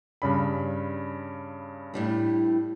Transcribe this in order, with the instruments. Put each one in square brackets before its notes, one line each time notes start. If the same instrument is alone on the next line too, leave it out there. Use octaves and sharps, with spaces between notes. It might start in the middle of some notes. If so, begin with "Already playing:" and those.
[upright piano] G2 C#3 B5
[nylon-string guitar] A2 G3 D4